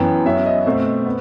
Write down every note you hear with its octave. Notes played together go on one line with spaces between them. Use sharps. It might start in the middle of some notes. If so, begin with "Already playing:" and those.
Already playing: F#2 E3 B3 G5
F#2 F#3 B3 E5
D#5
B2 A3 C4 C5
B3